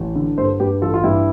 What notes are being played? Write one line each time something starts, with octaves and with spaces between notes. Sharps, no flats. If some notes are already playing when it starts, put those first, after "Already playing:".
Already playing: A1
D3
G2 A4 C5
G2 G4 B4
A1 F4 A4
F4
G2 E4 G4